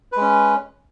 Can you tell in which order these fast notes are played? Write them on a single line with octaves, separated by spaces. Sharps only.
B4 G#3 C#4